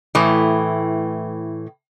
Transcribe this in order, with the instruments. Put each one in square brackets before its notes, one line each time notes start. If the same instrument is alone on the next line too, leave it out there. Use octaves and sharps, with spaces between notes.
[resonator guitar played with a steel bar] A2 E3 A3